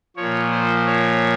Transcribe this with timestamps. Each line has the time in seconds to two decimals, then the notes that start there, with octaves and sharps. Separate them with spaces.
0.16 A#2 F3 C#5
0.51 C5
0.86 C#5